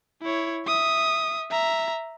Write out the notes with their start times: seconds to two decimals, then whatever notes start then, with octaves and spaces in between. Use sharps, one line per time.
0.22 E4 C#5
0.67 E5 D#6
1.51 E5 A#5